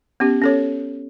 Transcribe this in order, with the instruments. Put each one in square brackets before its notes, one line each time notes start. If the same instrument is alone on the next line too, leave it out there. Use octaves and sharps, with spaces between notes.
[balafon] B3 C#4 G4
C#4 A4 C#5